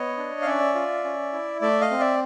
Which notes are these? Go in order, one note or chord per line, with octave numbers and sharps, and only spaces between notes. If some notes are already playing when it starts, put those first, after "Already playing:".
Already playing: B3 C#5 D#5
D4
F5
C#4 D5 E5
F4
C#4
E4
A3 D5 E5
D#5 F5
C4
D5 E5